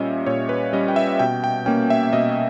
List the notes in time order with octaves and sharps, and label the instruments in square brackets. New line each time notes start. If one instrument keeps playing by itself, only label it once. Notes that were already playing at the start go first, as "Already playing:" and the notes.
Already playing: [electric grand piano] A#2 G3 C#4 D#5 E5
A#2 C#5
B4
G3 C#4 D#5
G5
E5
B2 G5
G5
A#3 C#4 G5
E5
B2 D#5